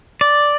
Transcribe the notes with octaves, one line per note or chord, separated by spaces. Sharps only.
D5